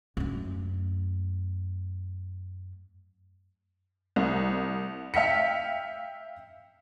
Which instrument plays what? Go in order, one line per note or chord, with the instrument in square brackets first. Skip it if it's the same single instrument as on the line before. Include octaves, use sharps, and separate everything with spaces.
[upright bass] F#2 A3
[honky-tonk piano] C2
E5 F5 G5 B6 C#7